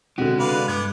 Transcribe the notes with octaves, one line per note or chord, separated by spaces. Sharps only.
B2 D3 G#3 C4 F#4 G4
C3 B4 D5 F5
G2 B3 D6 G#6